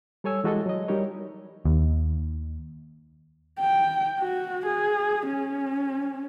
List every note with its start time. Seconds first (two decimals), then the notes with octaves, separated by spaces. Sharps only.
0.24 G3 A4 C#5 G#5 E6
0.44 E3 G#3 F#4 G4 A4 D#5
0.66 F#3 D#5
0.88 G3 D#4 G4 A#4 C#5
1.65 D#2
3.60 G5
4.20 F#4
4.66 G#4
5.27 C#4